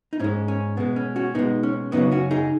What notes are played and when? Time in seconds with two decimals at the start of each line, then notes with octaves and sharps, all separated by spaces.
0.13 D#4
0.20 G#2 G#3 C#4
0.48 C#4
0.77 B2 G#3 B3
0.96 C#4
1.16 C#4 F#4
1.35 B2 G#3 B3 D#4
1.63 C#4
1.92 F#2 C#3 F#3 B3 D#4
2.11 C#4 F#4
2.31 D#4 G#4